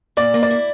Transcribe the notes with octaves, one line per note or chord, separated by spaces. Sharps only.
A#2 D5
A#3
D5
E4